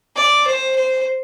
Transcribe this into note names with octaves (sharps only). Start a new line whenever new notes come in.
D5
C5
C5